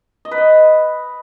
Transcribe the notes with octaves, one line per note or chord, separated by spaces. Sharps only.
D#5
B4
D#5